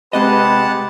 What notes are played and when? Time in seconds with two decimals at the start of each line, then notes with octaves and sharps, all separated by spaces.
0.13 C3 G#3 C4 G4 B4 D#5 F#5 A5